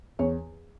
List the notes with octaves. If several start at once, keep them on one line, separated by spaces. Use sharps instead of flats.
E2 C#5